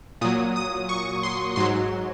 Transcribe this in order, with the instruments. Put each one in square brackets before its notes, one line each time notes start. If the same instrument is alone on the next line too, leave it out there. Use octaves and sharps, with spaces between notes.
[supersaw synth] A#2 F#3 D#6
D#6
C#6
C6
G#2 F#3 C6